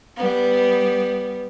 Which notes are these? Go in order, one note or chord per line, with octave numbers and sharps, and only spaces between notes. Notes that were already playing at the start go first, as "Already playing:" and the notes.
G3 B3